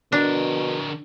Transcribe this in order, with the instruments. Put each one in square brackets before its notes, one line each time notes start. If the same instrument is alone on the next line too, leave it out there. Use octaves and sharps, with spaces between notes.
[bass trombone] B2 [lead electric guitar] D3 A#4 [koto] D4